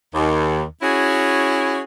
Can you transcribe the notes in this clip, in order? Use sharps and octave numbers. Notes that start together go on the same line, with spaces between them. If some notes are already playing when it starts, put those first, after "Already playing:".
D#2
C#4 E4 F#4 G#4